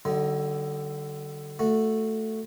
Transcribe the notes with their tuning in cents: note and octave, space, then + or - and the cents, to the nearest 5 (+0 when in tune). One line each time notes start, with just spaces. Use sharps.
D3 +0 F#3 +45 D#4 +0
A3 +5 F#4 -15